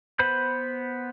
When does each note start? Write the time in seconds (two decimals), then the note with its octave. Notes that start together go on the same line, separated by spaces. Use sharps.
0.19 B3 B4 C5 B5 G6